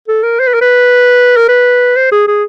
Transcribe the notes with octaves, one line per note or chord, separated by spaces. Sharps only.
A4
A#4
C5
B4
A#4
B4
A#4
B4
C5
G#4
G#4